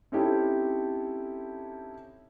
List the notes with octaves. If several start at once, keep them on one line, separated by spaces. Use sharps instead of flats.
C4 C#4 D#4 E4 G4 A4